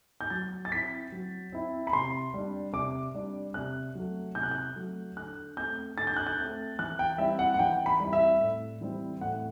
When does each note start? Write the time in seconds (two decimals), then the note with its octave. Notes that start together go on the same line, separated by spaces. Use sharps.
0.21 G6
0.30 F#3 A6
0.65 A6
0.72 C4 E4 B6
1.12 F#3
1.52 C4 E4
1.87 B5
1.93 C3 C6
2.34 G3 D4
2.73 C3 D6
3.14 G3 D4
3.54 C3 F#6
3.95 F#3 A3
4.35 C3 G6
4.43 F#6
4.51 G6
4.76 F#3 A3
5.16 D3 F#6
5.57 A3 C4 G6
5.97 D3 A6
6.07 G6
6.16 F#6
6.27 G6
6.38 A3 C4
6.79 E3 F#6
6.99 G5
7.18 G3 C4 E4 E5
7.39 F#5
7.54 F#5
7.59 E3 G5
7.86 B5
8.00 G3 C4 E4
8.13 E5
8.40 A2
8.81 E3 G3 C4 E4
9.21 A2 F#5